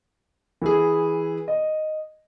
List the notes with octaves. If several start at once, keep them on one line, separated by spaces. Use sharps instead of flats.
E3 E4 G#4
D#5